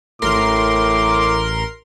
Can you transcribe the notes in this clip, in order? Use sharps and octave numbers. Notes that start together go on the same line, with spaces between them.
A1 A2 A#4 C6 D6